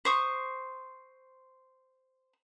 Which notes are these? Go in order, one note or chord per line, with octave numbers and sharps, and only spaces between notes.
C5 C#6 D#6